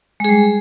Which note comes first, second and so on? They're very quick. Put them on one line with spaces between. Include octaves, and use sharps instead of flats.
G#3 G#4 G3